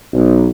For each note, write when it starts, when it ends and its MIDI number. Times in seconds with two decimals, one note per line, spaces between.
0.12 0.48 35